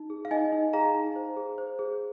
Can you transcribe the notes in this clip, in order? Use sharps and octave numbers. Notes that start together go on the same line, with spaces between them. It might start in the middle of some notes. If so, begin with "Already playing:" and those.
Already playing: D#4
G#4
F5
D#4 D#5 G#5
D#4
G#4 F5 A#5
D#4
C5
G#4
C5
G#4